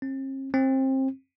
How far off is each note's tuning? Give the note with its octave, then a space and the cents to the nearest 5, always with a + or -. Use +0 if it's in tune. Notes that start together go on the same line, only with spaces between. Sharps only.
C4 +45
C4 +25